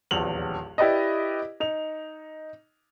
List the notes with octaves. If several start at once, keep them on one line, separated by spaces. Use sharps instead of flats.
D#1 A#1 E2 F7 F#7
E4 G4 B4 D5 D#5
D#4 F7